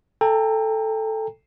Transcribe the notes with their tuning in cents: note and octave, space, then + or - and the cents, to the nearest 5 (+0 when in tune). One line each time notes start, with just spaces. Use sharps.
A4 +0 G5 +30 A#5 -25